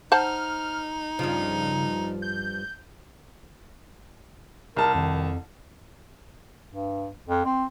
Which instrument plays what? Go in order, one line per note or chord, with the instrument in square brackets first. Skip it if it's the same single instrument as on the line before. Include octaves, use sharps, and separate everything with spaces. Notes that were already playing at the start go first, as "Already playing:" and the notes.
[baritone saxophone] D#4 [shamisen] C5 F#5 A5 [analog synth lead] F6
[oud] G2 F3 [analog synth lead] C#3
[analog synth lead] G6
[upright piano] C2 A5 [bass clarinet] A#4
[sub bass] F2 [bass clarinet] D#3
[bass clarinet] G2
F2
C4